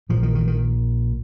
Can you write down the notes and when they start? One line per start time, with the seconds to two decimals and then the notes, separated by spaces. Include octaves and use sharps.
0.09 A#1 A#2 F3
0.23 D#3
0.35 D#3
0.47 D#3